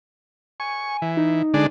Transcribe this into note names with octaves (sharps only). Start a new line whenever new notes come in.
G#5 C#6
E3
D#4
D3 G#3 D4